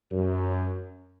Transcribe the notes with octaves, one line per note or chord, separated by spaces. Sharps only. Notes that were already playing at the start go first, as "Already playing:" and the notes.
F#2